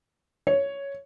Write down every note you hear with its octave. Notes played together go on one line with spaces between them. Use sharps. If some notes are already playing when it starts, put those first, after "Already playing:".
C#5